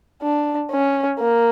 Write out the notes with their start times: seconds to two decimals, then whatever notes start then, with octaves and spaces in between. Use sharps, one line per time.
0.22 D4
0.72 C#4
1.19 A#3